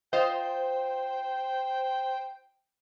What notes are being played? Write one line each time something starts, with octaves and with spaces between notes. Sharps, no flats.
F4 C5 D#5 G5